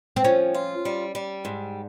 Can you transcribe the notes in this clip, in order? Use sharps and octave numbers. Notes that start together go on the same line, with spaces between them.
C4
F3 C#4
F4
G3
G3
G#2